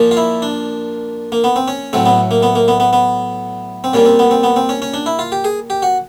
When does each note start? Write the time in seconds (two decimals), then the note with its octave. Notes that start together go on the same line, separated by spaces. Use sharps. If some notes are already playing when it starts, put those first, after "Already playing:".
Already playing: A#2 F3 A#3
0.11 F4
0.17 E4
0.42 D4
1.32 A#3
1.44 B3
1.56 C4
1.68 C#4
1.93 A2 F#3 A3 C4
2.06 B3
2.31 A#3
2.43 B3
2.55 A#3
2.68 B3
2.80 B3
2.93 B3
3.84 C4
3.93 A#2 G3 A#3 C#4
4.06 C4
4.19 B3
4.31 C4
4.43 B3
4.56 C4
4.69 C#4
4.82 C#4
4.94 D4
5.06 E4
5.19 F4
5.32 G4
5.44 G#4
5.70 G4
5.82 F#4